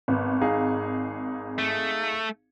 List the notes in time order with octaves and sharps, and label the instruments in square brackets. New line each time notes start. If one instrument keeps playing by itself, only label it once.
[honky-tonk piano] G#1 [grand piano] B3
[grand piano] D#4 G#4 F5
[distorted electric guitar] A3